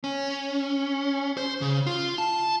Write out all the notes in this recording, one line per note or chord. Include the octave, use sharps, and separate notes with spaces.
C#4
C5
C#3
F4
A5